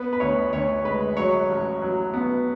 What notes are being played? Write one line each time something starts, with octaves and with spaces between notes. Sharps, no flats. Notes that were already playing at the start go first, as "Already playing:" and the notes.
Already playing: B3 B4
B4
D2 C#5
D2 C#5
G#3 B4
F#3 C#5
A1
F#3
B3